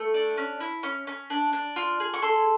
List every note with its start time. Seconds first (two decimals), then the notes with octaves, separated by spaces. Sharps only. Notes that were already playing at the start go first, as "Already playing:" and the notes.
Already playing: A3
0.14 D4
0.38 C#4
0.60 E4
0.83 C#4
1.07 C#4
1.30 D4
1.53 D4
1.76 F4
2.00 G#4
2.14 C#6
2.22 A4 C6